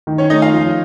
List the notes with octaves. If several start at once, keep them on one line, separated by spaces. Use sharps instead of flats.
D#3
C#4 C#5
A3 D#4 D#5
F4 F5
F3